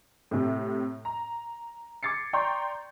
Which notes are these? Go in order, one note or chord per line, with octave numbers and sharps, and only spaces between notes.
A2 C3
A#5
D6 G#6 A6 C7 C#7
D5 G5 A#5 C6 C#6 G6